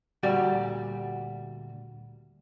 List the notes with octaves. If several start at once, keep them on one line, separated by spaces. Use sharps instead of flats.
D2 A#2 G3 F#4 G4 D5